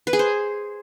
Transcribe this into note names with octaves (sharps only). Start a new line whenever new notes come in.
B4
G#4
C5